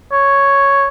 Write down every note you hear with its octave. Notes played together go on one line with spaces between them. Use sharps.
C#5